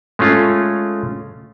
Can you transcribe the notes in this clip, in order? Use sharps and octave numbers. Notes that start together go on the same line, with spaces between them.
G#3 A3 C#4 F4